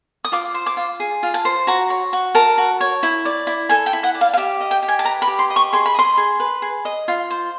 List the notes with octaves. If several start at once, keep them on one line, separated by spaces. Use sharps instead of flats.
D#6
F4 D6
C5
D6
F4
G#4
F4
A5
C5
F#4 A#5
C#5
F#4
A#4 A5
F#4
C#5
E4
D5
E4
A4 G#5
G5
E4
F#5
D5
F5
F5
G4 E5
D#5
G5
G4
G#5
A5
B4 A#5
B5
G4
C6
D#5
C#6
G#4 C6
B5
D#5 C6
G#4
B4
G#4
D#5
F4
C5